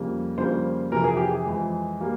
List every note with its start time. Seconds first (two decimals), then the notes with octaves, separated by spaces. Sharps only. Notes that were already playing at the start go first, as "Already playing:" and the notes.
Already playing: F2 C#3 G3 A#3
0.37 F2 C#3 G3 A#3 C5
0.92 F2 C3 E3 A#4
1.04 G#4
1.17 G4
1.29 G#4
1.46 F2 E3 G#3
2.01 G3 A#3